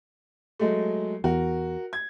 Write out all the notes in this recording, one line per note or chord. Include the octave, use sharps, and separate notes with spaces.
F#3 G#3 A3
E2 F#4 A#4
G#6